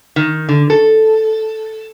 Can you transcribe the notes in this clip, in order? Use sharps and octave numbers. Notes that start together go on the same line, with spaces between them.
D#3
D3
A4